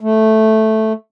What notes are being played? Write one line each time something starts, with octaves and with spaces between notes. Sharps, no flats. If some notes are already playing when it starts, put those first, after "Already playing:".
A3